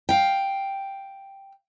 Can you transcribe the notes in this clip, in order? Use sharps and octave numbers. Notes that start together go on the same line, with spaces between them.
F5 G5